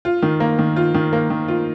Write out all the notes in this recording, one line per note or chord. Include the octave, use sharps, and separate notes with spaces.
F4
D#3
A#3
D#3
F4
D#3
A#3
D#3
F4